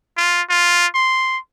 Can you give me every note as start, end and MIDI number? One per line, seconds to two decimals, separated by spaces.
0.17 0.42 65
0.50 0.87 65
0.95 1.38 84